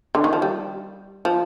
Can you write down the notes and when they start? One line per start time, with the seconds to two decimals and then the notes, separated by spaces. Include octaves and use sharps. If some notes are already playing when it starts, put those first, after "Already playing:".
0.15 D3
0.24 D#3
0.33 F3
0.42 G3
1.25 F3